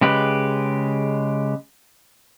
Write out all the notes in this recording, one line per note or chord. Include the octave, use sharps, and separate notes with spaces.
C#3 G#3 G4 B4